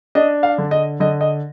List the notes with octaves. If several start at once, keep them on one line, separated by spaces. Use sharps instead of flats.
D4 D#5
F5
D3
D#5
D3 D#5
D#5